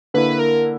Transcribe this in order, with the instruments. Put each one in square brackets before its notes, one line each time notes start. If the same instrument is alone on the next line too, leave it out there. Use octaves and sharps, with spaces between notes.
[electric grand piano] D3 A#3 E4 [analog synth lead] B4
[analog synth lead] B4
A#4